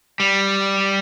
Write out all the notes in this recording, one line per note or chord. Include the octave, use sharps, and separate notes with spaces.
G3